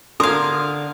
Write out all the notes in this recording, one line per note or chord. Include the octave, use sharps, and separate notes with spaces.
D3 A#4 F5 C6 D#6 G#6